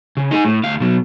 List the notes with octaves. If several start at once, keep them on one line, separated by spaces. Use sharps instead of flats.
C#3
D#4 G#4
A2
D2 F5
B2 F#3